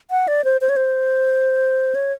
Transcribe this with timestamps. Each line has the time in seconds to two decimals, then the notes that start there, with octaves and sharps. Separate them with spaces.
0.11 F#5
0.28 D5
0.44 C5
0.61 C5
0.69 C#5
0.76 C5
1.95 C#5